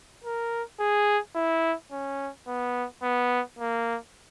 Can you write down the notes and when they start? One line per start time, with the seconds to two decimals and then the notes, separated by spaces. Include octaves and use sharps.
0.24 A#4
0.80 G#4
1.35 E4
1.92 C#4
2.47 B3
3.03 B3
3.59 A#3